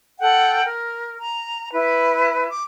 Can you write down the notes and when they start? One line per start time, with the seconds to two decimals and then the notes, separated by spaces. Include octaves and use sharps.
0.20 A4 F#5 G5
0.64 A#4
1.19 A#5
1.72 E4 B4
2.49 D6